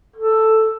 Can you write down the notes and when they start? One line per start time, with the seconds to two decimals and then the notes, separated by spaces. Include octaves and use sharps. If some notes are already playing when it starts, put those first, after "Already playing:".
0.16 A4